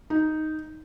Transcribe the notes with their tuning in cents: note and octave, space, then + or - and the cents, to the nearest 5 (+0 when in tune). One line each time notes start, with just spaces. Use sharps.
D#4 +0